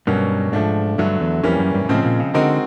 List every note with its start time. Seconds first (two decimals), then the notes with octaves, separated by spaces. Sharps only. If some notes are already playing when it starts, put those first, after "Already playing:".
0.07 G2 B2 F#3 A#3 C#4
0.52 G#2 F3 A3 D4
0.98 G2 D3 F#3 A3
1.20 E2
1.43 F2 E3 G3 A#3 C#4
1.59 F#2
1.75 G2
1.85 G#2
1.89 A2 C#3 F3 G#3 C4
2.05 A#2
2.20 C#3
2.34 D3 G#3 C4 D#4 F#4 A#4